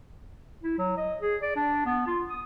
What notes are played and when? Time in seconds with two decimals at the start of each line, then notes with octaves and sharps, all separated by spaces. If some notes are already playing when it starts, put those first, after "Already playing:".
0.63 E4
0.78 F#3
0.97 D#5
1.21 G#4
1.42 D5
1.56 D4
1.86 B3
2.07 F4
2.29 D#6